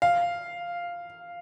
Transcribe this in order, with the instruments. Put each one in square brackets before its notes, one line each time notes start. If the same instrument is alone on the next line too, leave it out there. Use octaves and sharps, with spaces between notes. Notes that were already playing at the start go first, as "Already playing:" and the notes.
[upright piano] F5